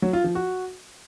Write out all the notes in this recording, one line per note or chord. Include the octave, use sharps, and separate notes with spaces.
F#3
F4
F3
F#4